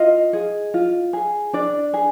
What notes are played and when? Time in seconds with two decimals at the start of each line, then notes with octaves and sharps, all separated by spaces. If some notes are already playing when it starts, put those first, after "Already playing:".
Already playing: F4 D#5
0.33 G#4
0.74 F4
1.13 G#4
1.53 D4 D5
1.94 G#4